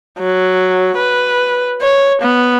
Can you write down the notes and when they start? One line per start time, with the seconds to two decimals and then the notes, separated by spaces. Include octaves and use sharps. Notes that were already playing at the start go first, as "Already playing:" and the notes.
0.19 F#3
0.97 B4
1.82 C#5
2.22 B3